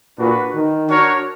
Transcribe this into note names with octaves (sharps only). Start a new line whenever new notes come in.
A#2 D4 F#4 B4
D#3
D4 F#4 A#4 C#5